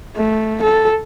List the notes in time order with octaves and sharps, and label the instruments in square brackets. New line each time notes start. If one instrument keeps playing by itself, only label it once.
[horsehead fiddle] A3
A4